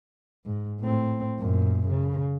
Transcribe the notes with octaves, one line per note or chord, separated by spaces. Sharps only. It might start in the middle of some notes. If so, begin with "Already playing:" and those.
G#2
A2 C4
F#2 A#2
C#3